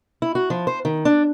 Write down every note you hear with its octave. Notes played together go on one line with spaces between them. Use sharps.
E4
F#4
F3
C5
D#3
D4